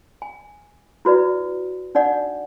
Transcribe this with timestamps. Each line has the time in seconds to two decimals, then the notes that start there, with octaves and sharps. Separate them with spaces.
0.22 G#5
1.05 E4 F#4 B4 D5
1.95 D4 D#4 D5 F#5